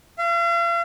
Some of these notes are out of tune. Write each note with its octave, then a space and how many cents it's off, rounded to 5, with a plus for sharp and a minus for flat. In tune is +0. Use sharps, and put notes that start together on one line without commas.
F5 -45